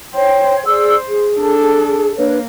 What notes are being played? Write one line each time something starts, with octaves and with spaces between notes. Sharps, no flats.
C5 C#5 G5
G#4 C5 D5 E6
G#4
D4 A4
A#3 D4 B4 C#5